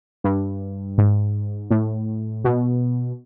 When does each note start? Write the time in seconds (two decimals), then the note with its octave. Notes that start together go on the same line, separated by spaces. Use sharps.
0.24 G2
0.98 G#2
1.71 A2
2.44 B2